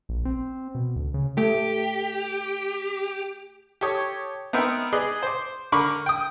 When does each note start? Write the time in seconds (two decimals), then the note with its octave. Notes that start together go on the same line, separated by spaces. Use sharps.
0.09 A#1
0.25 C4
0.75 B2
0.96 D2
1.14 C#3
1.38 A3 G4
3.81 G4 A4 C#5 D#6
4.53 B3 C4 D#4 A#4 E5 G5
4.93 G#4 B4 D5 D#5
5.23 C5 D6
5.72 D3 A#4 B5 C#6 D6
6.06 G5 D#6